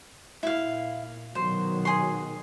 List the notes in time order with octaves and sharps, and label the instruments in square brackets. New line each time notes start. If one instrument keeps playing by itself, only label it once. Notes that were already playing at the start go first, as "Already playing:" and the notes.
[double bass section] A#2 [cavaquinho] E4 F5
[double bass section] B2 D#3 F#3 [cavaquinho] C5
[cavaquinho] G#4 C6